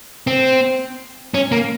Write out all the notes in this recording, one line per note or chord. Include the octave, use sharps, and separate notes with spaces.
C4
C#4
A#3